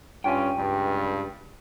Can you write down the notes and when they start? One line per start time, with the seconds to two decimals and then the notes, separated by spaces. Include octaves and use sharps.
0.24 G2 C#4 F4 G5 G#5
0.57 C#2 G2